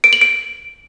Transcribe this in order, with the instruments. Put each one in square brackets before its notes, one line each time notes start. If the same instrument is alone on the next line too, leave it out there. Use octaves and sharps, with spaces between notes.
[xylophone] D7
F#7
D7